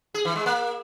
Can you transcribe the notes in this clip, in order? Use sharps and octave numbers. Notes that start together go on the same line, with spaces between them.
G#4
E3
G#3
A#3